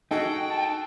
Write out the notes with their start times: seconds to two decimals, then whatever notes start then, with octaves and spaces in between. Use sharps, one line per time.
0.11 D#4 F#4 G#4 A4 G5
0.50 A5